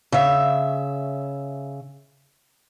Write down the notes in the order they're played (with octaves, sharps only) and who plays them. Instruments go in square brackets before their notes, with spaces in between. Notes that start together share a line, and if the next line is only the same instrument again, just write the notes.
[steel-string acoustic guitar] C#3 E5